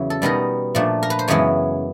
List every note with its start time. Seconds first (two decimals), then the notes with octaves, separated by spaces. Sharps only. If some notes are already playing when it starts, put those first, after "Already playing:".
Already playing: E2 C#3 F#3
0.10 A4
0.22 B2 G3 B3 D#4 A#4
0.75 A#2 F3 A3 D4
1.03 A#4
1.10 B4
1.19 C5
1.28 F#2 C#3 E3 G#3 B3 C#5